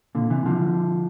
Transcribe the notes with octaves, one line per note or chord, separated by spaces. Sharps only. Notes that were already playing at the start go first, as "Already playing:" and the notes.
A#2 D3
C3 E3
D3 F3